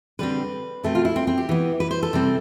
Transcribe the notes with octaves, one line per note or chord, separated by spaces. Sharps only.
D3 G3 C4 B4
B2 A3 C4 A4
F4
E4
C4
C4
G4
E3 B3
B4
C5
A4
C3 G3 C4